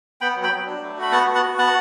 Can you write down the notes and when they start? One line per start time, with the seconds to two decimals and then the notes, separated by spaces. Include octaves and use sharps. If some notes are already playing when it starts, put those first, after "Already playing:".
0.21 B3 G5 B5
0.36 F#3
0.43 G5 B5
0.52 F#3
0.66 D4
0.82 A3
0.98 F#4 B5
1.12 B3 F#5 A5
1.27 F#4
1.35 F#5 A5
1.42 F#4
1.59 B3 F#5 A5